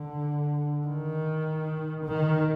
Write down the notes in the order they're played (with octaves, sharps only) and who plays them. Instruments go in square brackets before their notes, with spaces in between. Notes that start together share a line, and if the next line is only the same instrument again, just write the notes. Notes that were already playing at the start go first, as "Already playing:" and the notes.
Already playing: [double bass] D3
D#3
D#3